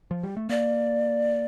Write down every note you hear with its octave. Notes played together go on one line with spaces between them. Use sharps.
F3
G3
A3
A#3 D5